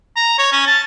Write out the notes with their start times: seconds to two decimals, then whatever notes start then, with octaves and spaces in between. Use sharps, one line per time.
0.17 A#5
0.39 C#5
0.53 C#4
0.67 A5